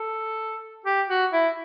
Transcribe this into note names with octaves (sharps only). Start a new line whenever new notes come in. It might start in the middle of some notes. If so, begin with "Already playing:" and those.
Already playing: A4
G4
F#4
E4